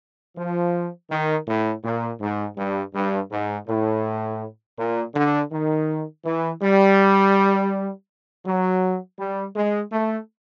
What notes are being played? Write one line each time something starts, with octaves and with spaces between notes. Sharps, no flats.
F3
D#3
A2
A#2
G#2
G2
G2
G#2
A2
A#2
D3
D#3
E3
G3
F#3
G3
G#3
A3